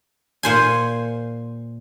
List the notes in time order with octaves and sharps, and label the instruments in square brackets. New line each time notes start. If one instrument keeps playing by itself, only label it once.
[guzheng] A#2 C5 G#5